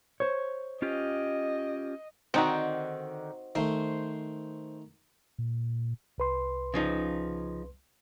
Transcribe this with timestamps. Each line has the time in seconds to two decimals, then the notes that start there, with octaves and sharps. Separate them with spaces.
0.20 C5 C#5
0.82 C#4 F4 G4 D#5
2.34 D3 D#3 C4 D#4 F#4
3.55 D#3 A3 C5
5.38 A#2
6.18 C2 B4 C6
6.74 C#3 F3 D#4